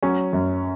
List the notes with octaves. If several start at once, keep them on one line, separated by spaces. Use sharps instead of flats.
F#3 C#4
F#2